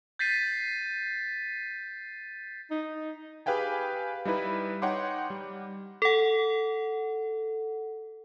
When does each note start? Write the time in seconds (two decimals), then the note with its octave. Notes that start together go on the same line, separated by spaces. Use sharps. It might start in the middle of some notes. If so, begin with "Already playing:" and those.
0.19 G6 A6 B6 C7 D#7
2.71 D#4
3.46 G4 G#4 B4 F5 G5 G#5
4.25 G3 D#4 E4 B4
4.82 D#4 C#5 F#5 G5 C6 D6
5.30 G3
6.02 A4 F#5